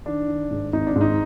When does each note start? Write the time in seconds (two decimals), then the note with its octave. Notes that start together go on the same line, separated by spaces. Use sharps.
0.06 D#3 D4
0.28 D#3
0.51 G#2
0.73 G#1 D#4
0.87 D4
0.96 G#2
1.01 D#4